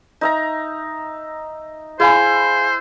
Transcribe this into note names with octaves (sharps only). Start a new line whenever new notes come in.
D#4 E5 A#5
E4 G#4 C5 F5 G#5